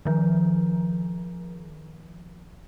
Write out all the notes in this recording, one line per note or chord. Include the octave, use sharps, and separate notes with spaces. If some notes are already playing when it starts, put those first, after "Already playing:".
D#3 F3